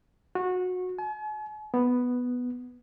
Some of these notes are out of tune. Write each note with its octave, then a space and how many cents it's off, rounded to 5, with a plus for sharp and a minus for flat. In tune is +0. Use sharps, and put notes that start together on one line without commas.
F#4 -20
G#5 +45
B3 +0